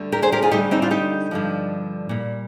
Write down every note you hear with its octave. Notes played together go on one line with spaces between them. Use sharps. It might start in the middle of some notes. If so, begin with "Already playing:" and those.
Already playing: D2 D3 G3
G4 A#4
G#4 C5
G4 A#4
F4 G#4
D2 D3 G3 D#4 G4
C4 D#4
D4 F4
D#4 G4
G2 D3 F3
A#2 G3